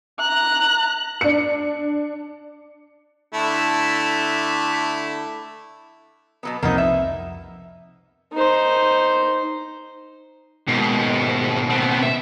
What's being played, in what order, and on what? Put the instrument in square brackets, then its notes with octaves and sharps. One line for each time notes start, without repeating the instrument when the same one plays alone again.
[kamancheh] A#5 F#6
[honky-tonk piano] D4 C#7
[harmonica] D3 A3 E4
[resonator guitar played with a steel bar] B2 F#3 B3
[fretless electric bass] C2 F2 C3 [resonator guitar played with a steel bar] A#3 B3 D#4
[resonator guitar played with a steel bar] E5
[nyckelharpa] D#4 C5
[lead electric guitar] D#2 B2 [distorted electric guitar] G#2
[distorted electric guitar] B3 C4
E5